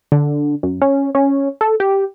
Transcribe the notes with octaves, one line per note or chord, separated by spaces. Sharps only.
D3
F#2
C#4
C#4
A4
G4